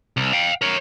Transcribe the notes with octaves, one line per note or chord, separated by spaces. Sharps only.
C2
F5 G5
A#4 C#5